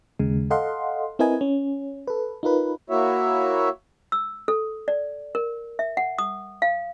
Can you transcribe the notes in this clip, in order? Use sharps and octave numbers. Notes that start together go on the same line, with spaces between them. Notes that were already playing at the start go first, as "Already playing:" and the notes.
D#2 C#3 G#3
A4 D#5 F5 F#5 C6
C4 E4 A#4 B4 D#5 G#5
C#4
A4 B4
D#4 F4 A#4 B4
A#3 E4 F#4 C#5 E5
E6
A4
D5
A#4
E5
F#5
D#6
F5